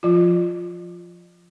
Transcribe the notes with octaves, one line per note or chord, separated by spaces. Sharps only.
F3 F4